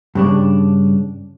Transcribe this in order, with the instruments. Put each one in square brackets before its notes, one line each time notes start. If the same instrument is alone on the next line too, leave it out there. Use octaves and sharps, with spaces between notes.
[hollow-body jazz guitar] G2 C#3 D4